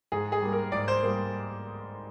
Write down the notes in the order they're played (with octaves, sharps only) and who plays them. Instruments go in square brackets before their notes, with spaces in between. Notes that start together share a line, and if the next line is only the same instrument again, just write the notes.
[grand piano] G#2 G#4
G#4
G3 A#3
A#4
G#2 D5
C5
G3 A#3